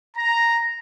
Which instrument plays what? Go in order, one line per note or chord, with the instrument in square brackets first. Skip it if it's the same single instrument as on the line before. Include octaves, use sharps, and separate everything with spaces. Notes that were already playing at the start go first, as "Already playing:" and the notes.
[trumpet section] A#5